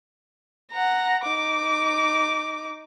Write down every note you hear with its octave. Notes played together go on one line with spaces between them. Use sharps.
F#5 A#5
D#4 D6